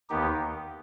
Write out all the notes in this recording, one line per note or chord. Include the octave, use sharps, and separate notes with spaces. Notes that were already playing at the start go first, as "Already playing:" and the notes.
D#2 D#3 B3 D#4 G4